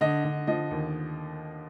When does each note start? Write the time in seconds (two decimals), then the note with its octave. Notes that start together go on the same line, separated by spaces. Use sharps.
0.01 D3 D#5
0.24 D3
0.47 F3 D#5
0.71 D#2